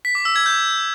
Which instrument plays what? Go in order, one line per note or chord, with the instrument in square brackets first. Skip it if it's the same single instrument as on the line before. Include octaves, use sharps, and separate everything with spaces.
[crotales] B6
D6
E6
G#6
G6